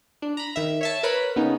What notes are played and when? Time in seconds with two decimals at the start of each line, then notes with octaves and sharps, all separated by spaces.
0.22 D4
0.37 A#5 B5
0.56 D#3 E5
0.81 C#5 E5 A5
1.03 A#4 B4 C#5 B5
1.36 C#3 B3 C#4 D#4